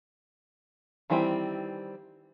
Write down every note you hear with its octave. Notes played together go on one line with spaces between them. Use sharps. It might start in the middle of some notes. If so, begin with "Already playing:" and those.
D#3 E3 G3 C4 E4